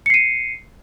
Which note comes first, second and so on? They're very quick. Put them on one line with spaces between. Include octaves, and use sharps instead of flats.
C#7 C7 D#7